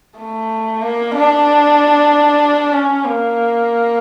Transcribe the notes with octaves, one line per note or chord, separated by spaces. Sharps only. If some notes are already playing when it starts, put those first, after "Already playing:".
A3
A#3
D4
C#4
A#3